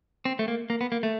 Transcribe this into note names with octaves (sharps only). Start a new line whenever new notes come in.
C4
A3
A#3
A#3
B3
A#3
A3